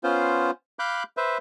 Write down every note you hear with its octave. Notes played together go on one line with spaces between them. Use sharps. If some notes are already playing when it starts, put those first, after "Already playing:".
B3 C#4 F4 C5
F5 B5 D6 F#6 G6
B4 C5 E5